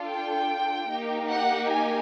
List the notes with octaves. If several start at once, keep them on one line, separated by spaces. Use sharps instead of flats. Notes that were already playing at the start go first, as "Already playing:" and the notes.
Already playing: D4 F4 A4
G5
A#3 D#4 G4
F#5
G#5